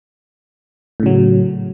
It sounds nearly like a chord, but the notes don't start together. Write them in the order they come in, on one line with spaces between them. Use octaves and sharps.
A2 C#3 F#3